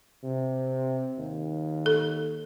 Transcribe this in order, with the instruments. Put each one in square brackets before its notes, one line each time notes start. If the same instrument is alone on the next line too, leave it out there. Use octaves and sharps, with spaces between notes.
[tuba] C3
D#2
[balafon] A4